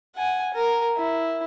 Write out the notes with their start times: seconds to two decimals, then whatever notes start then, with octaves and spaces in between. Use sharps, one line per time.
0.15 F#5 G#5
0.54 A#4
0.97 E4